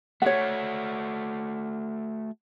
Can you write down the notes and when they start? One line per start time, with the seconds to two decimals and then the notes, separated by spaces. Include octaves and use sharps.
0.22 A3 F#4 C#5 F#5